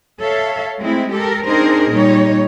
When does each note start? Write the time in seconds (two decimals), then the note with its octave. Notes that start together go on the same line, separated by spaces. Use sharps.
0.20 A4 C#5 E5 F5
0.79 G#3 A3 C4 E4
1.12 G4 A4 A#4
1.46 C4 D4 D#4 G#4 A#4 C5
1.90 A#2 G3 D#4 C#5